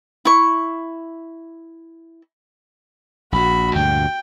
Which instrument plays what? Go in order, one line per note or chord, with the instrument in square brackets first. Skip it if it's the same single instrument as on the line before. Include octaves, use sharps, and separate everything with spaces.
[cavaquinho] E4 C#6
[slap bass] A#1 [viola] F#4 B5
[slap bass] D2 G2 A#2 [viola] G5